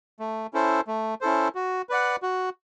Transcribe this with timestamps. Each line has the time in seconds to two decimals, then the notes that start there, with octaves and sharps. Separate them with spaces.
0.20 A3
0.53 C#4 E4 A4 C5
0.87 A3
1.21 C#4 E4 A4 C5
1.55 F#4
1.89 B4 D5 F#5
2.22 F#4